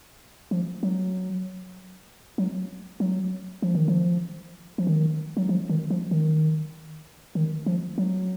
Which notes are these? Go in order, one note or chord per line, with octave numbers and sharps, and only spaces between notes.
F3
F#3
F#3
F#3
F3
D#3
F3
F3
D#3
F#3
F3
D#3
F3
D#3
D#3
F3
F#3